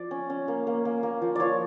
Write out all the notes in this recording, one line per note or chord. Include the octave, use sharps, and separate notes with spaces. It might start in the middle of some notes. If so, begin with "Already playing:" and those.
Already playing: F3 D5
C#4
C#4
A#3
A#3
A#3
A#3
F3
F3 C#5 D5